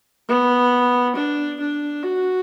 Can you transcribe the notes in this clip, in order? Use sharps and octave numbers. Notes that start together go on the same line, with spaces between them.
B3
D4
D4
F#4